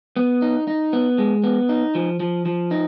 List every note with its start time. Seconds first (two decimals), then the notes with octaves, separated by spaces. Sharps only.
0.17 B3
0.42 D#4
0.68 D#4
0.93 B3
1.18 G#3
1.44 B3
1.69 D#4
1.95 F3
2.20 F3
2.46 F3
2.71 D#4